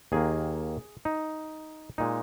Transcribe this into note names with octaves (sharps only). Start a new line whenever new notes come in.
D#2 D#3 A#3 G#4
D#4
A#2 G#3 D#4